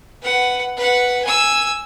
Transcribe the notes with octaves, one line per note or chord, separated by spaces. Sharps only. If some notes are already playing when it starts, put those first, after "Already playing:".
B4 F#5
B4 F#5
G#5 E6